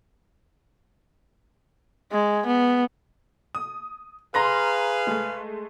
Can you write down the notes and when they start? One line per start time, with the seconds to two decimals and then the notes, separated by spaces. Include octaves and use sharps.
2.12 G#3
2.46 B3
3.55 D#6
4.35 G#4 B4 F5 A#5 C6 A#6
5.07 G#3 A3